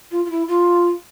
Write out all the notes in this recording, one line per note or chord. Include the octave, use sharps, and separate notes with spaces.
F4
F4
E4
F4